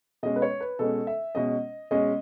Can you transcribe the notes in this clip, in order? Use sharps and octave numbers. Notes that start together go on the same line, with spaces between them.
B2 G#3 C#4 D#5
B4
C#5
B4
B2 G#3 C#4 A4
E5
B2 G#3 C#4 D#5
B2 G#3 C#4 D#5